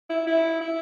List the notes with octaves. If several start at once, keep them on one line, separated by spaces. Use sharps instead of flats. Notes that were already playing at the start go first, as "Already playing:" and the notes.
E4
E4
E4